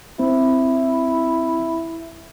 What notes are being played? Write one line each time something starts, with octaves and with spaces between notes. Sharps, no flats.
C4 E4